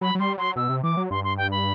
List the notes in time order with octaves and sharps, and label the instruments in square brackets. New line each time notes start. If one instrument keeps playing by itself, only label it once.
[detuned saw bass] F#3 [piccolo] B5
[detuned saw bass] F#3
[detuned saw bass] G3 [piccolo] C6
[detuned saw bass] F#3 [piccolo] C6
[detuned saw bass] B2 [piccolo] E6
[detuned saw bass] C3
[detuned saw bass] E3 [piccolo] D6
[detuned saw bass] F#3
[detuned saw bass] G2 [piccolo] C6
[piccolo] C6
G5
B5